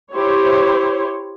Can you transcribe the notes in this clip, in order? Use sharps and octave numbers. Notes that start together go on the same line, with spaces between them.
E4 G4 C5 C#5